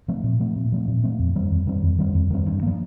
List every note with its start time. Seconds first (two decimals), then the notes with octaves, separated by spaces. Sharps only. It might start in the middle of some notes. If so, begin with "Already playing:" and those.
0.08 F3 A3 C4
0.24 A#2
0.40 F3 A3 C4
0.56 A#2
0.72 F3 A3 C4
0.88 A#2
1.04 F3 A3 C4
1.19 F2
1.35 D#3 G3 C4
1.51 F2
1.67 D#3 G3 C4
1.83 F2
1.98 D#3 G3 C4
2.15 F2
2.30 D#3 G3 C4
2.46 G2
2.63 F3 A#3